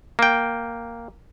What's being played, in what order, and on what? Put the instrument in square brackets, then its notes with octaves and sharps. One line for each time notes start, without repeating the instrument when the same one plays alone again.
[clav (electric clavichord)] A#3 G5